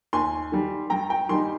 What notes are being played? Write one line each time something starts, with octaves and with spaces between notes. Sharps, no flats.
D#2 G#5 C6
D#3 G3
G2 G5 A#5
G5 A#5
D#3 G3 A#3 D#4 G#5 C6